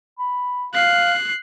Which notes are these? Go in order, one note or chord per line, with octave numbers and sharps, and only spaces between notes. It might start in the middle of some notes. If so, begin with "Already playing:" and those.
B5
F5 F#6 C7